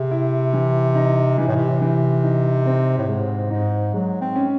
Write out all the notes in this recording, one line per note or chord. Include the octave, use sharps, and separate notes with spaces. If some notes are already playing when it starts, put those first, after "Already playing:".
Already playing: C3 G#4
E4
E3
D#4
C3 E3
A2
C3
E3
D#4
C4
A2
G#2 G#3
G#2 D#4
F#3 G#3
C4
C#4